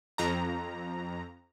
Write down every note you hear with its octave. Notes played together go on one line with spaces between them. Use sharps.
F2 A#5